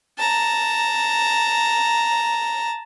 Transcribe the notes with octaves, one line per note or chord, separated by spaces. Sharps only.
A5 A#5